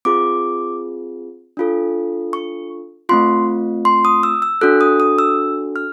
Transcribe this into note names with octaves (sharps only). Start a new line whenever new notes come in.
C4 F4 G#4 D6
D4 F4 A4
C#6
A3 C4 F4 C6
C6
D#6
E6
E6
D4 F#4 A4 F#6
D#6
D#6
E6
F6